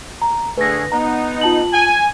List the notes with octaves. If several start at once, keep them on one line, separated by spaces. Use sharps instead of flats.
A#5
D3 A3 G#4 B4 A#6
B3 D#4 A#5
F4 A5 F#7
G#5